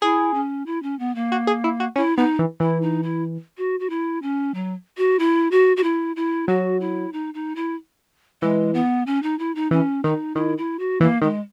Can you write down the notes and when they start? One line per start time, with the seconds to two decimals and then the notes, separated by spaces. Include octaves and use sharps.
0.02 E4 G#4
0.34 C#4
0.66 E4
0.83 C#4
0.99 B3
1.15 A#3
1.32 F#4
1.47 G#4
1.64 E4
1.80 F#4
1.96 C#4 E4
2.17 B3 D#4
2.39 E3
2.60 E3 E4
2.82 D#4
3.03 E4
3.57 F#4
3.80 F#4
3.90 E4
4.22 C#4
4.54 F#3
4.97 F#4
5.19 E4
5.51 F#4
5.77 F#4
5.83 E4
6.16 E4
6.48 F#3 F#4
6.81 E4
7.13 D#4
7.34 D#4
7.56 E4
8.42 E3 G#3
8.74 B3
9.07 C#4
9.23 D#4
9.39 E4
9.55 D#4
9.71 E3 C#4
10.04 D#3 D#4
10.35 D#3 E4
10.58 E4
10.79 F#4
11.00 E3 A#3
11.21 D#3 G#3